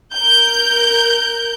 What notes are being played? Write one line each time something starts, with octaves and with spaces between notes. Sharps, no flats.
A#4 G6